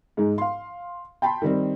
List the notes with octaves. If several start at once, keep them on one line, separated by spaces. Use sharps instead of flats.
G#2 G#3 D#4
F5 C6
G5 A5 B5 C6
D#3 G3 C4